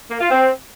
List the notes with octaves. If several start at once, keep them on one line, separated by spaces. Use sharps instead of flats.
A#3
F4
C4